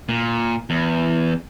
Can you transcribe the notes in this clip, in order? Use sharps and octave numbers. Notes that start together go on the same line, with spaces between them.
A#2
E2